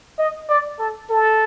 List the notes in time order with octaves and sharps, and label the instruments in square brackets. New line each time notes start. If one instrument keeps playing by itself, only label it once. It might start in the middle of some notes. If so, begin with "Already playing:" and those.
[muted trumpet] D#5
D5
A4
A4